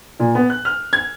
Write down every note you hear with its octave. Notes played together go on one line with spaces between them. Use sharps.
A#2
B3
F#6
F6
G#6